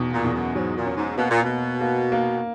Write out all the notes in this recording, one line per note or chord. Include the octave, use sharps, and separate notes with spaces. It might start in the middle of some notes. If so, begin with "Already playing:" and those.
Already playing: E2 B2
A#2
E2
F#2
G#2 F#3
A#2
C#4
G#2
B2 A#3
A#2
B2
A#3
A#3
A#3